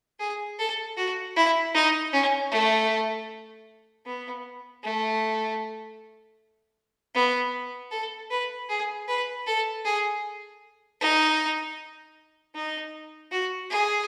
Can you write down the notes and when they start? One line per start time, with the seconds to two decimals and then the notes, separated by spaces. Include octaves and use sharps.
0.20 G#4
0.59 A4
0.97 F#4
1.36 E4
1.74 D#4
2.13 C#4
2.52 A3
4.06 B3
4.83 A3
7.15 B3
7.91 A4
8.30 B4
8.69 G#4
9.08 B4
9.47 A4
9.85 G#4
11.00 D#4
12.54 D#4
13.32 F#4
13.70 G#4